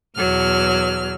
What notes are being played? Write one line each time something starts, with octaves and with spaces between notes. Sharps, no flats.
E2 B2 F#3 F6